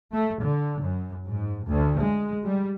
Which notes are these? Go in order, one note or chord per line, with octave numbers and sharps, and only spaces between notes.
A3
D3
F#2
G#2
D2
G#3
G3